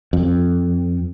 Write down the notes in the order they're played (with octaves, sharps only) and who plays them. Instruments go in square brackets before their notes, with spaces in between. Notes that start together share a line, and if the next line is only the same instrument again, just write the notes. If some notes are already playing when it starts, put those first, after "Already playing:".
[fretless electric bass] F2